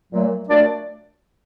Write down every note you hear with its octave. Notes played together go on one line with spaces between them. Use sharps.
A#2 F#3 A3
A#2 F#3 A3 D4 D5